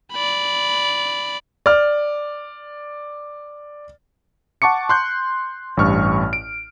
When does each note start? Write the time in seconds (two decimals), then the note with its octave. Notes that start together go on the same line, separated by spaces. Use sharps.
0.13 D5 B5
1.66 D5 F6
4.62 F#5 A5 C#6 D6 C#7
4.89 C6 F#6 G6
5.77 A1 G2 C#6 F6
6.33 D7